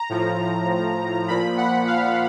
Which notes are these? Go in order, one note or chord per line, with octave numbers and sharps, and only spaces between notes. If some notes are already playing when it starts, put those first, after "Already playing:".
Already playing: A#5
A2 F3
A#2 F3 B5
F#5
F5